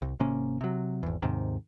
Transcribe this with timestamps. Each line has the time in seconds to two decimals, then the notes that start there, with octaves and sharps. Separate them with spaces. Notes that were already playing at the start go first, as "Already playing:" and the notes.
0.02 C2
0.20 G#1 C3 A#3 C#4
0.61 C3 F#3
1.03 G#1 E2
1.22 D#2 G#2 C3 D#3